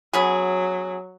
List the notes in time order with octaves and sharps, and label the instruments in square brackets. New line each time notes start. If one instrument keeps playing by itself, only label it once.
[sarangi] F#3 [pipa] B3 C#4 G#4